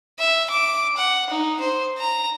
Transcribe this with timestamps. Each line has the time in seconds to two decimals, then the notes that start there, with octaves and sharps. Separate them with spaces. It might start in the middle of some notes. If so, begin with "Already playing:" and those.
0.19 E5
0.50 D6
0.96 F#5
1.30 D#4
1.60 C5
1.98 A#5